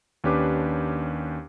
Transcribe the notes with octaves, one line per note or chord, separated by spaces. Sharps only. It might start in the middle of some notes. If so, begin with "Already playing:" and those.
D#2 C#4 D4 G4 B4 D6